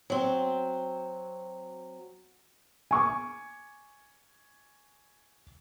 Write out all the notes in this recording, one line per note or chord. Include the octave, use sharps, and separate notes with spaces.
F#3 C4
G#5 C#6 D6